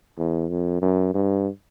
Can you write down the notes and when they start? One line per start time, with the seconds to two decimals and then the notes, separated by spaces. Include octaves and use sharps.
0.18 E2
0.50 F2
0.82 F#2
1.14 G2